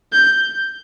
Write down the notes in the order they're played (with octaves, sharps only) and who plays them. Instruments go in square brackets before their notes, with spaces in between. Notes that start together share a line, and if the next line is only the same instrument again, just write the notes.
[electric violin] G6